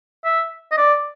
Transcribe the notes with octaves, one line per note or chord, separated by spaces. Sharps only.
E5
D#5
D5